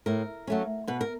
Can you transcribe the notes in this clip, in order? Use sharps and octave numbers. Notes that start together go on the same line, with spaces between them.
A2 A#4
F#3 A3 C#4
B2 B4
A#4